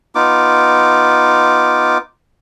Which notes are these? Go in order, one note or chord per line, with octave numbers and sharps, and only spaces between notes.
B3 D#4 F4 D6